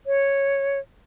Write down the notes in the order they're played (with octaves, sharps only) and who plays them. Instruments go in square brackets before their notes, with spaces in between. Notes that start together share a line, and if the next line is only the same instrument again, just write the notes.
[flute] C#5